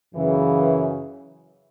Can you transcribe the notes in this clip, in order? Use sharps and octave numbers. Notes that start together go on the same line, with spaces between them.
F#2 C#3 E3